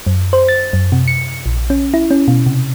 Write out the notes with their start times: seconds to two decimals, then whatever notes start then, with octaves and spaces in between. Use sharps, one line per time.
0.07 F#2
0.33 C5
0.49 A6
0.73 F#2
0.92 C3
1.08 C#7
1.46 A#1
1.70 C#4
1.94 E4
2.11 C#4
2.28 B2
2.46 C3